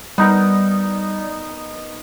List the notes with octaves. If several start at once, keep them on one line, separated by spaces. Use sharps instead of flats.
G3 B3 D#4 A#4